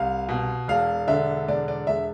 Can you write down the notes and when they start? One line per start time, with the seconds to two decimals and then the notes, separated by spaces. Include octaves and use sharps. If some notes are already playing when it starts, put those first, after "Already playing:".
Already playing: C2 F5
0.29 B2
0.68 E1 F5
1.08 D3 E5
1.48 E1 D5
1.68 D5
1.87 E1 E5